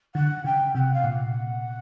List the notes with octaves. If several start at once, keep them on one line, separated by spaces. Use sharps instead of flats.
D3 F#5
C#3 G5
C3 F#5 G5
F5
A#2 F#5